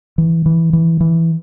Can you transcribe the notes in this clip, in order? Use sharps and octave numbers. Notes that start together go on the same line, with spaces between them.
E3
E3
E3
E3